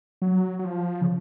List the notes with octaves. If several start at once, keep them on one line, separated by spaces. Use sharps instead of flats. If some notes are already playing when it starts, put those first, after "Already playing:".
F#3
F#3
F3
C#3